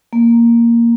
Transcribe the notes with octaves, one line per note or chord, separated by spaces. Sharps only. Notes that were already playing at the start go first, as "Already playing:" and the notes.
A#3